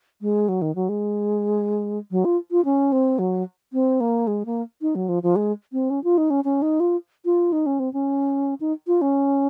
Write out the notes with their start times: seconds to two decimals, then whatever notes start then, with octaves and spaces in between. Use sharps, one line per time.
0.21 G#3
0.49 F#3
0.62 D#3
0.75 F#3
0.89 G#3
2.11 F#3
2.25 F4
2.51 F4
2.65 C#4
2.92 C4
3.19 F#3
3.73 C4
4.00 A#3
4.27 G#3
4.46 A#3
4.81 D#4
4.95 F#3
5.09 F3
5.23 F3
5.36 G#3
5.73 C4
5.90 C#4
6.04 F4
6.18 D#4
6.30 C#4
6.44 C#4
6.62 D#4
6.80 F4
7.25 F4
7.52 D#4
7.66 C#4
7.79 C4
7.93 C#4
8.60 D#4
8.87 F4
9.01 C#4